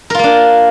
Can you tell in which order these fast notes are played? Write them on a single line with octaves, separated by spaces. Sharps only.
A#4 F4 A#3 D4